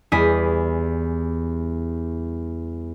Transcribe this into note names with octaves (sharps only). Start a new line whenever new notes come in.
E2 G3 E4 G#5 D#6 B6